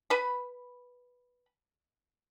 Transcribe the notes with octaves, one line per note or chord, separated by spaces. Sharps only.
B4 B5